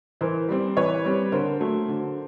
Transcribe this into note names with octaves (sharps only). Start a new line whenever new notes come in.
E3 A#4 C5
G3 C4
E3 B4 C#5
G3 C4
D3 A#4 C5
F#3 A3
D3